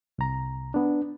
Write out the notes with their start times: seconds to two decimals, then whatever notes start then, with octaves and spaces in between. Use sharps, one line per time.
0.18 C2 A#5
0.74 B3 D4